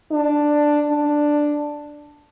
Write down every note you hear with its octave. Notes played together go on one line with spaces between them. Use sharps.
D4
D4